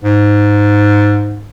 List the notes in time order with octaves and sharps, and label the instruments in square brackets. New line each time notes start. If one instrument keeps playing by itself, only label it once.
[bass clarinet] G#2